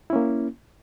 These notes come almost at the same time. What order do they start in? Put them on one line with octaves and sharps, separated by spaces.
E4 C#4 A#3